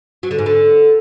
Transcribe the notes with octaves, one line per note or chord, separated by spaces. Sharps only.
F#3
D3
G#2
D3